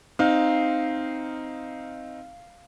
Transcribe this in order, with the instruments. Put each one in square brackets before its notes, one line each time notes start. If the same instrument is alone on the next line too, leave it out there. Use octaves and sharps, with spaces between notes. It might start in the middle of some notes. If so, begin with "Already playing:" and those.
[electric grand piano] C4 D#4 [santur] F5